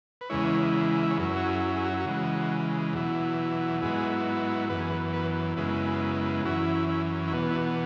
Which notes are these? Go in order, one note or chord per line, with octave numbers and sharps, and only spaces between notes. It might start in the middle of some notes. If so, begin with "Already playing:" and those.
B4
E2 C#3 G#3 E4 C#5
E5
C#5
F#2 F#3 C#4 E4 B4
F#4
G#4
G#4
F#4
E4
F#4
C#3 E3 G#3
E2 B2 F#3 E4
G#2 F#3 B3 E4 G#4
F#2 E3 B3 B4
G#4
B4
B4
F#2 C#3 G#3 B3 E4
F#2 E3 C#4 E4 F#4
E4
E4
E2 B2 B3 F#4
E4
F#4